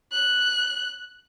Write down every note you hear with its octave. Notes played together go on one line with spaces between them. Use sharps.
F#6